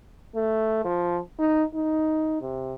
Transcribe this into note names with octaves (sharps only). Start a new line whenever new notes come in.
A3
F3
D#4
D#4
C3